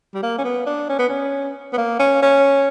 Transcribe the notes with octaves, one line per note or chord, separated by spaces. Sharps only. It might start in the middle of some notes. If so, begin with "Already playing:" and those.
G3
A#3
C#4
B3
D4
C#4
B3
C#4
B3
A#3
C#4
C#4